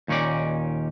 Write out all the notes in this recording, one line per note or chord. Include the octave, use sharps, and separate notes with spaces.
D#2 A#2 C#4 D#4 D5